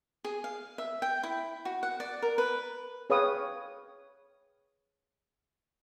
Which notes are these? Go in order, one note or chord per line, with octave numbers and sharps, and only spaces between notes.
G#4
F5
E5
G5
E4
F#4
F#5
D5
A#4
B4
G#4 B4 C#5 F5 G5 D#6